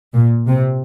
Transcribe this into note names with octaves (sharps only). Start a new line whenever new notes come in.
A#2
C3